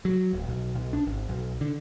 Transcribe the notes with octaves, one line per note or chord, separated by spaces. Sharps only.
F#3
D1
B1
B1
D4
G#1
B1
D3